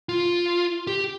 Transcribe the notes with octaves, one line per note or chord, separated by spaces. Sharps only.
F4
G4